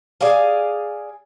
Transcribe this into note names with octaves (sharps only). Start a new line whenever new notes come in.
G#4 D5 F5 G#5